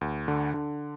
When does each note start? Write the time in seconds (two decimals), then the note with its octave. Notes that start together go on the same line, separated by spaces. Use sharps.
0.01 D2
0.28 D3
0.54 D3